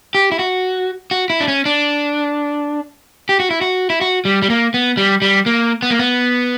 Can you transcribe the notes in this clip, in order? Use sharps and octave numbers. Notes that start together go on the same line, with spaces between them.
G4
E4
F#4
F#4
E4
D4
C#4
D4
G4
F#4
E4
F#4
E4
F#4
G3
G3
A#3
B3
G3
G3
A#3
B3
A#3
B3